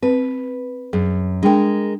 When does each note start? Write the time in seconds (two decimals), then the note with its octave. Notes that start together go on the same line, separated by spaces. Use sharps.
0.03 C4 B4
0.93 F#2 G#4
1.43 G#3 D4 A#4 G5